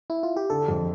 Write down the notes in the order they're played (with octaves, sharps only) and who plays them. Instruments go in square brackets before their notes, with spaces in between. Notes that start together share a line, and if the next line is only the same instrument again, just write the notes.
[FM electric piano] E4
F4
G4
[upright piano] D3 [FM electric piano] A4
[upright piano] F2